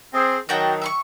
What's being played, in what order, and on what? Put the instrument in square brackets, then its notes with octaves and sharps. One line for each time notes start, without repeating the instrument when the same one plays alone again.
[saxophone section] C4 G#4
[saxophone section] D#3 F#3 [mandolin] F#4 G5 A5
[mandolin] E5 C6 C#6